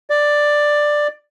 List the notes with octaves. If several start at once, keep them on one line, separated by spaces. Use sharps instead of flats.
D5